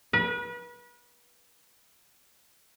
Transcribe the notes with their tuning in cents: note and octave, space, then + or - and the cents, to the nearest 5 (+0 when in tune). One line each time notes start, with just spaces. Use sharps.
B4 -35